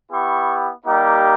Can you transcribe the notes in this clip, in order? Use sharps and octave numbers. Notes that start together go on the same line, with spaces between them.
B3 E4 G4 C#6
G3 A#3 D#4 G4